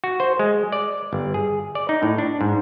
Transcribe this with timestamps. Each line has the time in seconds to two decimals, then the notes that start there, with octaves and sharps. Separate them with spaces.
0.04 F#4
0.20 C5
0.39 G#3
0.72 D5
1.13 G1
1.34 G#4
1.75 D5
1.89 D#4
2.03 A2
2.18 D4
2.41 G#2